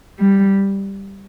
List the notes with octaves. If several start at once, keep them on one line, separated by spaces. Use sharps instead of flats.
G3